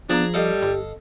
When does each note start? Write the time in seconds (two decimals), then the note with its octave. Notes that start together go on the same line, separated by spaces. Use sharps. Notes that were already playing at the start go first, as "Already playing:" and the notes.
0.10 F3 B3 D4 G#4 A#5
0.34 G3 G4 A4 D#5 F5
0.62 G1